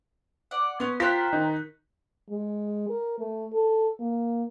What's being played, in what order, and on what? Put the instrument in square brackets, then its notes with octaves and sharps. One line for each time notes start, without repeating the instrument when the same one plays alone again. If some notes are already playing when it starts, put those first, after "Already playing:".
[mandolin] D5 F#5
[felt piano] B3 [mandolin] C#4 C6
[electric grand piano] F4 C6 F#6 [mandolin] G4 A#4 C5 [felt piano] B6
[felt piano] D#3 [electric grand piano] D#4
[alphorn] G#3
A#4
A3
A4
A#3